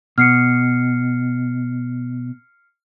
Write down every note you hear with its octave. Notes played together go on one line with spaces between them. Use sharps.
B2 F6 C7 C#7